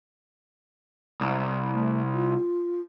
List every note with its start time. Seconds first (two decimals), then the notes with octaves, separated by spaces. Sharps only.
1.21 C2
1.73 A3
2.13 F4